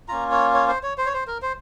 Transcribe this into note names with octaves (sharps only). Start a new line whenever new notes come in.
A#3 C#4 F4 A#5
C#5
C#5
C5
C#5
C5
C#5
C5
A#4
C5